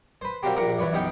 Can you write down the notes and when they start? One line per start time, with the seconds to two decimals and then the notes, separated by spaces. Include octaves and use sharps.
0.21 B4 C5
0.43 F#3 G3 A#3 C4 F#4 G4
0.56 A#1 A#2 A#4 F#5 A#5 D6
0.78 E3 F#3 B4 C#5 D5
0.93 B1 F#2 D#4 G4 F#5 G5